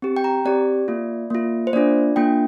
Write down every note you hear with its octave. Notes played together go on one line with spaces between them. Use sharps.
C4 G4
G5
A#5
C4 G4 D5
A#3 F4
A#3 F4
C5
A#3 D4 F4 D5
A#3 D4 F4 G5